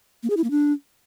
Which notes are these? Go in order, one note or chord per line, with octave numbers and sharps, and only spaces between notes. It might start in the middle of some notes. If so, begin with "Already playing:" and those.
A#3
G#4
E4
A#3
D4